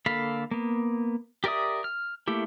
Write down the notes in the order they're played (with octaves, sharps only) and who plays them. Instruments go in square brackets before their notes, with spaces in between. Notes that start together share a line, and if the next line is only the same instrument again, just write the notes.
[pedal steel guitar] D3 A#3 A4 F5 B5
A#3 B3
G4 A#4 D5 E5 D#6
F6
A3 A#3 E4 G4